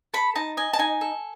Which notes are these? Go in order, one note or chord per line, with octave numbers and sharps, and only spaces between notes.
A4 B5
D#4 A5
D#5 G#5
A5
D#4 G#5
A4